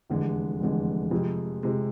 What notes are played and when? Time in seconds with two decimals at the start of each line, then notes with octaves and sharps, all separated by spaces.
0.10 F1 E2 D3 G#3
0.61 F1 E2 D3 G#3
1.11 F2 C3 G#3
1.63 C3 G#3